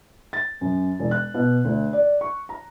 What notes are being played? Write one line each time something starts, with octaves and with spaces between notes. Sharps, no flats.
A6
F#2
E1
F#6
B2
D2
D5
C#6
A#5